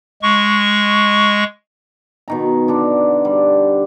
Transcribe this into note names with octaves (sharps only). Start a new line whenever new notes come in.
G#3 C#6
B2 D#3 A#5
D3 D4
G3